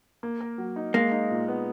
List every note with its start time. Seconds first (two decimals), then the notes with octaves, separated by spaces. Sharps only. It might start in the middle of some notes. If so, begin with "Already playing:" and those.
0.23 A#3
0.41 A#4
0.58 F#3
0.76 D#4
0.94 G#3 A#3
1.12 D#4
1.30 A#2
1.48 B3